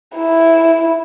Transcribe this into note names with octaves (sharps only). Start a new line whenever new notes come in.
E4